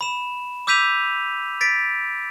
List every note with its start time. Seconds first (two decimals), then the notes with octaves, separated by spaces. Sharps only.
0.01 B5 E7
0.67 D6 E6 G6 B6 D#7 F7
1.61 A6 B6 D7